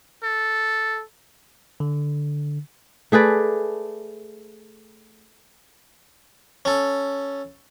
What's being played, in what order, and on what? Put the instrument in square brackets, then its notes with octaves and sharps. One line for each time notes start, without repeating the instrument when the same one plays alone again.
[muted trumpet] A4
[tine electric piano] D3
[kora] A3 G#4 B4 D5
[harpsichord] C#4 A4